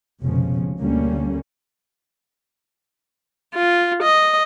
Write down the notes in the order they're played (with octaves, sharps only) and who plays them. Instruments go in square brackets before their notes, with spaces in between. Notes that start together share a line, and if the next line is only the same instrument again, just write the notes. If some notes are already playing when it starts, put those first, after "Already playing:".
[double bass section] F1 C#2 B2 F3 C#4
D2 D3 G3 A#3 C#4
[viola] F4
D#5